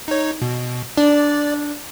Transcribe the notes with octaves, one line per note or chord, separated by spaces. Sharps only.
D#4 C#5
B2
D4 D5